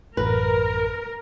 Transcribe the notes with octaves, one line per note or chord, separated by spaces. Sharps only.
A1 F#2 A#4 B4